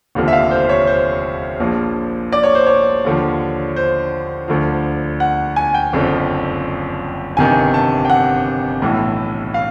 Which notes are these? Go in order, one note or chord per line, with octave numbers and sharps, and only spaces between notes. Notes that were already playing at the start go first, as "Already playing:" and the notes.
F1 D#2 D3 F3
E5
F5
C5
C#5
C5
A#1 A#2 F3
D5
C#5
C5
C#5
D#2 D3 F3
C5
D2 D3 F3
F#5
G#5
G5
F#1 F2 D3 F3
G1 F2 C3 D#3 G#5
A5
G5
F#5
B1 A2 E3
F5